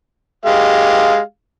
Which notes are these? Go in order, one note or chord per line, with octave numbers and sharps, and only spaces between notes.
G#3 G4 F5